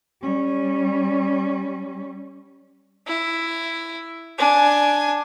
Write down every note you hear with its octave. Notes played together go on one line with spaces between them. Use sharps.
G3 C#4
E4
D4 G#5